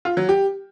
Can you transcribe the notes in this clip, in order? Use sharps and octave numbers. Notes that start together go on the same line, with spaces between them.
F4
F#3
G4